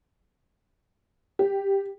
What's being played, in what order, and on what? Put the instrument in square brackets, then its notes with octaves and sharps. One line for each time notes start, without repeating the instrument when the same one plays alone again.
[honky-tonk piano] G4